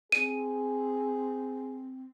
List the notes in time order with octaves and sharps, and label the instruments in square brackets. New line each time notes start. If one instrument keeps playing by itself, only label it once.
[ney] C4 [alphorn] G#4 [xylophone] D#7